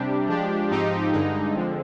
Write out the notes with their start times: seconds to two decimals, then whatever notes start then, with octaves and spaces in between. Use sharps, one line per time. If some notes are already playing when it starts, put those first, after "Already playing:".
Already playing: C3 G3 D4 G4
0.28 F3 G#3 D4 G4
0.70 G#2 F3 C4 D#4 G4
1.12 G2 D3 G#3 D#4
1.55 D3 F3 G#3 C4